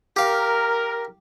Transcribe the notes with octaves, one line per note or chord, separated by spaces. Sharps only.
G4 A#4 F5